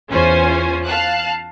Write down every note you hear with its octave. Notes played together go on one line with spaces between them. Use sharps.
E2 C#4 F4 C5 G#5
F5 A5 F#6